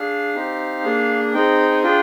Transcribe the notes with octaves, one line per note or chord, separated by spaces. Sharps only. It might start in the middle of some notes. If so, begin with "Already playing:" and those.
Already playing: D4 G#4 F5
C4 D#4 G4
A#3 D4 G#4
C4 D#4 G#4 G5
G#5
D4 F4 G#4 G5